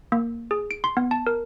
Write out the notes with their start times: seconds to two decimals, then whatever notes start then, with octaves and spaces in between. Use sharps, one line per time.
0.12 A#3
0.51 G#4
0.71 D7
0.84 C6
0.97 B3
1.11 A5
1.27 A#4